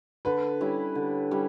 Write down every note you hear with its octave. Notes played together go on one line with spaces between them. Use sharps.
D3 B4
G3 C#4 E4
D3
G3 C#4 E4